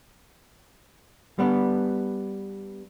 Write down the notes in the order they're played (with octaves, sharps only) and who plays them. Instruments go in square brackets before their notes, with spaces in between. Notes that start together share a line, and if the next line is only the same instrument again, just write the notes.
[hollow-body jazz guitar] G3 B3 D4